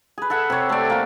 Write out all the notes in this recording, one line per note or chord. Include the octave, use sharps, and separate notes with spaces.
G#4 B4
A4 E5 F#5
C3 C#5
A3 D5
A#3 G4